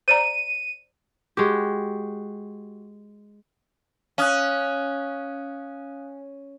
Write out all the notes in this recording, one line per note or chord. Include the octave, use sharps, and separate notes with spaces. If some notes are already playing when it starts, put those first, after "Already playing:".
C5 D5 A#5 D#7
G#3 F#4 G4
C#4 F5 D#6 F#6